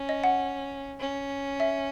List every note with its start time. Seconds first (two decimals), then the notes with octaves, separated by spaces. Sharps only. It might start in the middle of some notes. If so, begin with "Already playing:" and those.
Already playing: C#4
0.09 D#5
0.24 F#5
1.00 C#4
1.60 E5